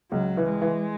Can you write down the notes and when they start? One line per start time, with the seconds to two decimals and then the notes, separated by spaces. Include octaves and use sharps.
0.11 C#2 F#3
0.37 E3
0.50 G#3
0.62 E3